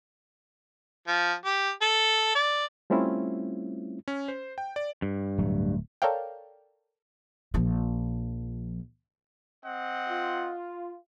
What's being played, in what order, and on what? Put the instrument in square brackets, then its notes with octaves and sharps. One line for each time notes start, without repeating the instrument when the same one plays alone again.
[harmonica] F3
G4
A4
D5
[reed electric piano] G3 A3 C4 C#4 E4 F4
[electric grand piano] C#4
C5
G5
D5
[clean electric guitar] G2
[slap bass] D1 F#3 A3
[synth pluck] A4 A#4 C#5 D5 F5 G5
[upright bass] A#1 F3
[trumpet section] C4 D#5 F#5
[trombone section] F4